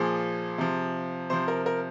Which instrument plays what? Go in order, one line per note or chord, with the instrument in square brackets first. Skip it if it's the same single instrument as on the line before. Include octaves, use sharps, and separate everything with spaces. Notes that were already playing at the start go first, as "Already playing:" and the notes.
Already playing: [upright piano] A#2 F3 G#4
C3 F3
C3 F3 C5
A#4
A#4